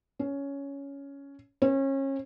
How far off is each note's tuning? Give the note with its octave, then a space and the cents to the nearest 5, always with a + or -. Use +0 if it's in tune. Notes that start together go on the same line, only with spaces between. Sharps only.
C#4 +10
C#4 -30